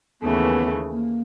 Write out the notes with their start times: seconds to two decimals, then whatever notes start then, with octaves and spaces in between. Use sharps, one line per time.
0.21 D#2 C#3 E3 A3 B3
0.91 A#3